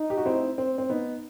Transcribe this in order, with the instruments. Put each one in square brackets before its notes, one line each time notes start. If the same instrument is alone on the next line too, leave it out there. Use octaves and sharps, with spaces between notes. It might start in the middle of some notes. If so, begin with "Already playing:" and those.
Already playing: [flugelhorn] D#4
[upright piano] G4
F#4
C4 E4
C4
C4
B3 D#4